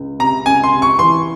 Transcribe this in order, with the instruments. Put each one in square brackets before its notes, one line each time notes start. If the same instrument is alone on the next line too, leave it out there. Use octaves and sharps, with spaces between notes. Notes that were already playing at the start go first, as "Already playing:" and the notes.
Already playing: [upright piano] C#2
[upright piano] C3 [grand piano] A#5
[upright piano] C#2 [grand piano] G#5
[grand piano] C6
[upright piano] C3
[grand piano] C#6
[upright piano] E3 [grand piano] C6